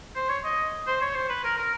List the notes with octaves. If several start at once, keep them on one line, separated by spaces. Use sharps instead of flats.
C5
C#5
D#5
C5
C#5
C5
B4
A#4
A#4